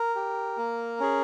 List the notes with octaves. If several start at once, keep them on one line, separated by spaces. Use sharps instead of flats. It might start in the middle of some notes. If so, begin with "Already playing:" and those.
Already playing: A#4
G4
A#3
C#4 G#4